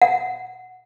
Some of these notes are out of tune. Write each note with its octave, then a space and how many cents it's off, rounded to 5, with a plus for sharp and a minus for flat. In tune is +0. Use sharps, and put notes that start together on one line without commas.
F#5 -5